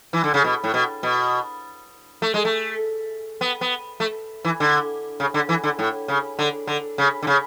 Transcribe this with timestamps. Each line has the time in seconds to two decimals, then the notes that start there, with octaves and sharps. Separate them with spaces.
0.13 E3
0.24 D3
0.34 C#3
0.44 B2
0.64 A2
0.74 B2
1.03 B2
2.22 A3
2.34 G#3
2.45 A3
3.41 B3
3.61 B3
4.00 A3
4.45 E3
4.60 D3
5.20 C#3
5.34 D3
5.49 E3
5.63 D3
5.79 A2
6.08 C#3
6.39 D3
6.67 D3
6.98 C#3
7.23 D3
7.27 C#3